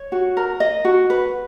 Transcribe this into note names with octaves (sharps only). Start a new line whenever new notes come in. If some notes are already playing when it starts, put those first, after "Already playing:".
Already playing: C#5
F#4
A#4
D#5
F#4
B4